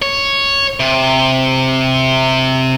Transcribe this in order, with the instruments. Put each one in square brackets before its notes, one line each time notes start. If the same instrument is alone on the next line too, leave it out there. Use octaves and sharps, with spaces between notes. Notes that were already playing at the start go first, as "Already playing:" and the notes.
[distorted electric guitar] C#5
C3